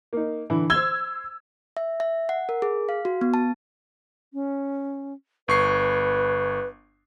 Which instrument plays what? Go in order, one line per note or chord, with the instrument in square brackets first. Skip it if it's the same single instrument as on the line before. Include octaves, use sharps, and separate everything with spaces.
[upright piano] A#3 D#4
D3 E3 E4
[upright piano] C5 G7 [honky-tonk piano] E6 G#6
[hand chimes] E5
E5
F#5
A#4
G#4
F5
F#4
B3
A5
[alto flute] C#4
[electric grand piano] G1 C#6 C7 [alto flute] B4